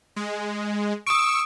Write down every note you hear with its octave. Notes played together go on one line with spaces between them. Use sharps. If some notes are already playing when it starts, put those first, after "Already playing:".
G#3
C#6 D#6 E6 D7